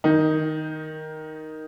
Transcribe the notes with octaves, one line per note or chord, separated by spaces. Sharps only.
D#3 D#4